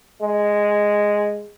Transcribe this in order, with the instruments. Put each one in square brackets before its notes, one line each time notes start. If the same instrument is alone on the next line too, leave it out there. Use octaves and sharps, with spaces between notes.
[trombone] G#3